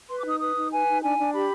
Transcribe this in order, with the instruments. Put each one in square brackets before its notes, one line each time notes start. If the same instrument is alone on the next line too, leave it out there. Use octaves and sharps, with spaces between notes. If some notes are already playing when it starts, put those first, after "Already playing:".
[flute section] B4 C6
D6
D#4 D#6
B4 D#6
D#4
B4 G#5
D#4
D4 G#5
D4
G4 B5